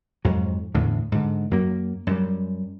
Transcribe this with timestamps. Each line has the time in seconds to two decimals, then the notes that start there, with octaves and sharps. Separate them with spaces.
0.25 F2 G#2 F#3
0.75 E2 A2 D3
1.12 G#2 D3
1.51 F#2 F#3 A#3
2.07 F#2 G3